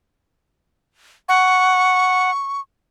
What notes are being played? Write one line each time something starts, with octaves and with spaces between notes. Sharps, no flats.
F#5 C#6